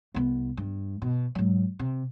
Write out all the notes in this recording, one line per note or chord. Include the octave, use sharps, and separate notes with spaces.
C2 B3
G2
B2
G#2 F#3
C3